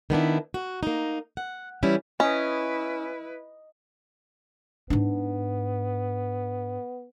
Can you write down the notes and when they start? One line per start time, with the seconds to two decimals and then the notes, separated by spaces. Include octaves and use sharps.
0.10 D#3 B3 D4 E4
0.54 F#4
0.83 A#3 D#4
1.37 F#5
1.83 E3 G3 C#4 E4
2.20 C#4 E4 B4 D#5
4.90 G#2 B3 D4